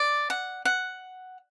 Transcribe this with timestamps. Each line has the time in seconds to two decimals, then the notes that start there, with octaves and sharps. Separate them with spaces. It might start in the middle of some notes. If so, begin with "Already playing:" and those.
Already playing: D5
0.30 F#5
0.65 F#5